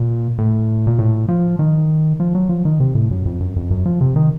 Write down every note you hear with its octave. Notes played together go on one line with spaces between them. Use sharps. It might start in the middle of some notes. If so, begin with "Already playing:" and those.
Already playing: A#2
A2
A#2
A2
F3
D#3
F3
F#3
F3
D#3
C3
A2
F#2
F2
F#2
F2
F#2
F3
C3
D#3